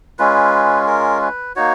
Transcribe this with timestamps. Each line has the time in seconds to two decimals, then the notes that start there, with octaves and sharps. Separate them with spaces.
0.19 G#3 C#4 F4 B4
0.87 A#4
1.22 B4
1.56 A#3 D#4 F#4 C#5